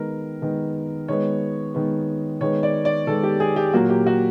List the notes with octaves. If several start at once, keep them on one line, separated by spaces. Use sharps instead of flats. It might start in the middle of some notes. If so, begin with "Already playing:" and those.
Already playing: D#3 G#3 B3 A#4
D#3 G#3 B3
D#3 G#3 B3 C#5
D#3 G#3 B3
D#3 G#3 B3 C#5
D5
D5
D#3 G#3 B3 A4
G4
G#4
G4
A#2 F#3 A#3 F#4
G4
F#4